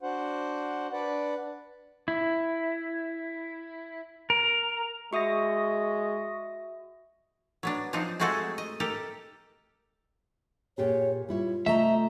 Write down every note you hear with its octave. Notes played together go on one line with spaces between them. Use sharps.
D4 F#4 C5 F#5
D4 B4 D5 F#5
E4
A#4
G#3 F#4 E5 C#6 D#6 A#6
F#3 B3 D4
F3 C4 D4 D#4 C5
G#3 A3 C4 F#4 G#4 A4
D#5
G4 A4 A#4
A#2 G4 G#4 C#5
G3 E4 F4 C#5
C3 A3 D#5 E5 A#5